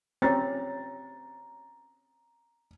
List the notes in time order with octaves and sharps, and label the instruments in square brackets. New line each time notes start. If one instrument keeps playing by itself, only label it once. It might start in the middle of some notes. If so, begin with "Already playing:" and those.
[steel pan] C4 C#4 G4 [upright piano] A#5 A6